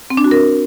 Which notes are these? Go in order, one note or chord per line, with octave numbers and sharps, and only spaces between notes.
C4
D4
F#4
A#4